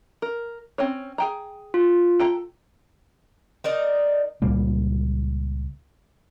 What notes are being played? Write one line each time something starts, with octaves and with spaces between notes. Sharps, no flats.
A#4
C4 C#4 C#5
G#4 G5 A#5
F4
A4 G5 A#5
D#4 A#4 D5 D#5
C#2 A#2 G3 A#3